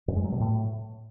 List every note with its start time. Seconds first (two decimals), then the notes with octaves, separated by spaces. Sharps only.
0.08 F#2
0.16 G#3
0.24 F#3
0.32 B2
0.40 A2